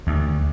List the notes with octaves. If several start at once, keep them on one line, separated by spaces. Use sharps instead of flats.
D2